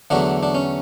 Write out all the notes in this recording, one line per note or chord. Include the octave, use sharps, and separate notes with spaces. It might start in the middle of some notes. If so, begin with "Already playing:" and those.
E2 D3 F#3 A3 D4
D4
C#4